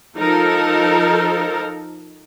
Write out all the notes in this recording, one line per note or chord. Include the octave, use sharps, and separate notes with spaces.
F3 D#4 A4 A#4